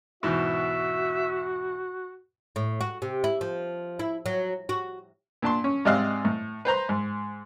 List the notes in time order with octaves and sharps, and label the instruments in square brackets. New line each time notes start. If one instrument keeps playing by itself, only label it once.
[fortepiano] E2 G#2 B2 [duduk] F#4 [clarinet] E5
[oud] A2
F#4
C3
E4
F3
E4
F#3
F#4
[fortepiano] A#2 D4 A5 C6
C#4
G#2 C3 D5 D#5 F5 F#6
A2
B4 C5 A#5 C6
G#2